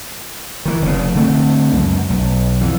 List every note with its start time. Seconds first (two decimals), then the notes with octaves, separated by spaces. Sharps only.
0.65 D#3 E3
0.82 F1 C#3
1.15 D3 A3 C4
1.72 C#2 F#2
2.10 B1
2.61 F2 E3